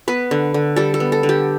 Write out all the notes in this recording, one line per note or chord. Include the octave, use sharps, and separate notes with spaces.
B3 B4
D3
D3
G3 A4
A4
B3
A4
D3
G4